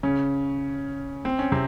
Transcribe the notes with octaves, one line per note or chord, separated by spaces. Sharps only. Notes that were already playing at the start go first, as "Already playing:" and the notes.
C#3 C#4
C4
C#4
C3 C4